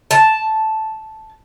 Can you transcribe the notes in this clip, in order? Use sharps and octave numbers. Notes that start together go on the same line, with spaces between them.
A5